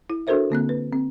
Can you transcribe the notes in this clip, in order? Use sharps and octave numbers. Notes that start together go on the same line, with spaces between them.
E4
D4 F#4 A4 A#4 C5 E5
D3 A#3 C4 F#6
B4
C4